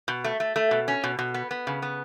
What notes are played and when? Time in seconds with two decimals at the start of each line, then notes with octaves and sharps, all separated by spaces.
0.08 B2
0.24 A3
0.40 A3
0.56 A3
0.71 B2
0.88 C#4
1.04 B2
1.19 B2
1.34 B3
1.51 B3
1.67 C#3
1.82 B3